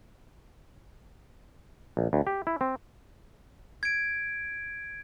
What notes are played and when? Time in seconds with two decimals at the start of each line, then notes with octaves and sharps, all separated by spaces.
1.97 A#1
2.13 D2
2.27 G4
2.47 E4
2.61 C4
3.83 G#6 D7